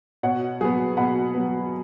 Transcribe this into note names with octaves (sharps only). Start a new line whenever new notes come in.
B2 C#5 F#5
F#3 B3 G#4
B2 F#5 B5
F#3 B3